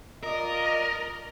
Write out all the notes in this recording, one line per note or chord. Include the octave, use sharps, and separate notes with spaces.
F4 A#4 D5 D#5